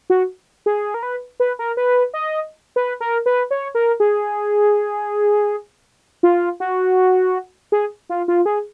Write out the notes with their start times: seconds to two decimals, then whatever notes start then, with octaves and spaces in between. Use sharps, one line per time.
0.10 F#4
0.66 G#4
0.94 A#4
1.03 B4
1.40 B4
1.59 A#4
1.77 B4
2.14 D#5
2.76 B4
3.01 A#4
3.26 B4
3.51 C#5
3.75 A#4
4.00 G#4
6.23 F4
6.60 F#4
7.72 G#4
8.09 F4
8.28 F4
8.46 G#4